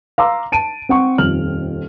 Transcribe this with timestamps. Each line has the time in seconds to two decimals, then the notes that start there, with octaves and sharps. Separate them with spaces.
0.18 F5 A#5 C6 D6 E6
0.52 A5 D7 D#7
0.89 C4 F#5 C#6
1.18 D#1 F2 F6 F#7